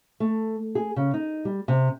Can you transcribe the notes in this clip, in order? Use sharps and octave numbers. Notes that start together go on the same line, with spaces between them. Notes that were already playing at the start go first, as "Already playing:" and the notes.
A3
G#4
C#3
D#4
G3
C3